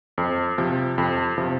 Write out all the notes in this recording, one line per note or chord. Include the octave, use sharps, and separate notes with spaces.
F2
C3 F3
F2
C3 F3